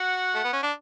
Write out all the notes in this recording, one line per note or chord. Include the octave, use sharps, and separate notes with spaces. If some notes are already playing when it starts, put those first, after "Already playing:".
Already playing: F#4 F#5
A3
B3
C#4
D4